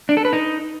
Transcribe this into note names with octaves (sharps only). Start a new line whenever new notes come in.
D4
A4
B4
D#4